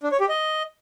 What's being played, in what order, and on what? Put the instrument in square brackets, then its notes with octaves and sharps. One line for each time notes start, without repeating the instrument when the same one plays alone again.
[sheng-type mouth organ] D4
C#5
G4
D#5